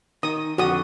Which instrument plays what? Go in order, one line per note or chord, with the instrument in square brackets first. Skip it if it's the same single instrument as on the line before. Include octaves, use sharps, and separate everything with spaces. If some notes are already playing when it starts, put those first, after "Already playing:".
[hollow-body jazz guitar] D#3 [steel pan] D#6
[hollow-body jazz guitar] F2 D3 [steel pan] F#4 D#6